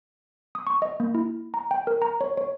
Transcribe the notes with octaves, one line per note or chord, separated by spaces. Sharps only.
D#6
C#6
D#5
A#3
E4
A#5
G5
A#4
A#5
C#5
C#5